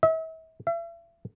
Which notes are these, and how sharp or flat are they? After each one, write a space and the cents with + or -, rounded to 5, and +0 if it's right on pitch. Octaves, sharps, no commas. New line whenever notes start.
E5 -40
E5 +40